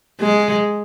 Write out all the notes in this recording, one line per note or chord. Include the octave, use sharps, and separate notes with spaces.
G#3